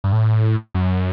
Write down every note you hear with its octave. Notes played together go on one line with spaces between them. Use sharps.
G2
A2
F#2